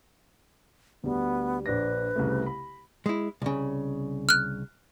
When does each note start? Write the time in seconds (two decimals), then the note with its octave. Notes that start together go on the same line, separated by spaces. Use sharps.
1.04 D2 G3 B3
1.66 A#1 D4 B4 A#6
2.16 C2 C#3 A3
2.46 B5
3.06 G#3 E4
3.42 C2 C#3
4.29 F6 F#6